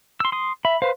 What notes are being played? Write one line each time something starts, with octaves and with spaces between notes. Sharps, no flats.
C6 E6
C6 D#6
E5 B5
B4 C5 F5